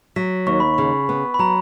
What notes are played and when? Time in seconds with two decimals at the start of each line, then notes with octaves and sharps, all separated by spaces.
0.16 F#3 B6
0.47 D#2 C#6
0.60 B5
0.74 C#3 C#6
1.09 B3
1.34 B5
1.39 F#3 A#5